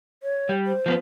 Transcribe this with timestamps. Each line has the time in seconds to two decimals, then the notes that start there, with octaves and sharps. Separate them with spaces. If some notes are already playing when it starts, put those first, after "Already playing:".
0.23 C#5
0.49 G3
0.67 C5
0.86 F3 A#3 B3